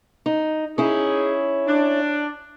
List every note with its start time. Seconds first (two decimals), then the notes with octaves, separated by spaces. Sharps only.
0.26 D#4
0.78 C#4 D#4 E4 G#4
1.67 D4